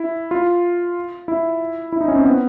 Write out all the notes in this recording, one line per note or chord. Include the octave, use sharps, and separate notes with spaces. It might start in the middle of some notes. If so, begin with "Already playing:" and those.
Already playing: E4
F4
E4
E4
D#4
C#4
C4
B3